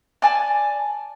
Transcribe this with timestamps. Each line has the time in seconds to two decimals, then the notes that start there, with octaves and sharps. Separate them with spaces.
0.22 D5 G#5 A5